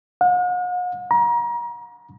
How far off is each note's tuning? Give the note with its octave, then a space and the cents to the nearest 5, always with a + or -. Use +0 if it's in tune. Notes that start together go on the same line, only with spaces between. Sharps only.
F#5 -45
A#5 +35